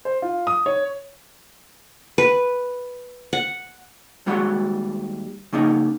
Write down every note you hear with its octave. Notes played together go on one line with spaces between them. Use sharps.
C5
F4
D#6
C#5
B4
F#5
D#2 G3 G#3 F#4 C#5 F#5
C#3 A#3 C#4 D#4